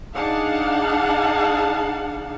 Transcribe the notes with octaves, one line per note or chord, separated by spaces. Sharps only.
D4 D#4 G#4 F5 F#5 A5